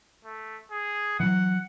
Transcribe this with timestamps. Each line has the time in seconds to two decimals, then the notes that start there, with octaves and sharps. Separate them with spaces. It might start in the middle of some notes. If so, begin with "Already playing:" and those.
0.25 A3
0.71 G#4
1.20 E3 F#3 F#5